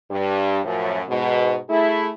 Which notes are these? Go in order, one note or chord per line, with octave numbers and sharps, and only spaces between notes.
G2
F#2 A2 F3
G#2 B2
A3 E4 G#4